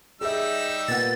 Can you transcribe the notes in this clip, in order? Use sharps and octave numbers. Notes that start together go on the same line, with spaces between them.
G3 D#4 G#4 E5 E6
A#2 B3 F#5 A6